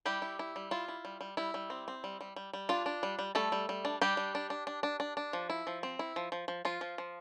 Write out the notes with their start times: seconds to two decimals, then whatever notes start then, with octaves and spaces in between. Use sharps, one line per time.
0.05 G3 E4 G4
0.22 E4
0.39 E4
0.56 G3
0.71 E4 F4
0.88 E4
1.05 G3
1.21 G3
1.37 G3 E4
1.54 G3
1.70 C4
1.88 C4
2.04 G3
2.21 G3
2.36 G3
2.53 G3
2.69 D4 F4
2.86 D4
3.03 G3
3.19 G3
3.35 G3 A3 A4
3.52 G3
3.69 G3
3.85 D4
4.02 G3 D4 G4
4.17 G3
4.35 D4
4.50 D4
4.67 D4
4.83 D4
5.00 D4
5.17 D4
5.33 F3
5.50 E4
5.67 F3
5.83 C4
5.99 E4
6.16 F3
6.32 F3
6.48 F3
6.65 F3 F4
6.81 F3
6.98 F3